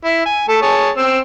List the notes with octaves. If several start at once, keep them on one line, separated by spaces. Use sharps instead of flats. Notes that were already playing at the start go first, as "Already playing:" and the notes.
E4
G#5
A3 A4
G#4 C#5 A5
C4 E6